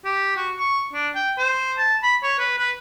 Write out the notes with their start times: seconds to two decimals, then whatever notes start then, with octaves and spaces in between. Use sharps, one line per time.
0.05 G4
0.36 F#4
0.59 C#6
0.93 D4
1.15 G5
1.38 C5
1.78 A5
2.03 B5
2.23 C#5
2.39 B4
2.58 B4